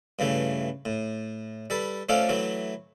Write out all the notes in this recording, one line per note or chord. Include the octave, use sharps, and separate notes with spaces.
G2 C#3 E3 A3
A2
G3 A4 B4
F3 A3 C#4 A4 D5 F5
E3 F#3 A3